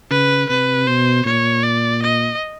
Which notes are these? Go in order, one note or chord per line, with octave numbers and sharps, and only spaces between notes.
C#3 B4
C3 B4
B2 C5
A#2 C#5
D5
D#5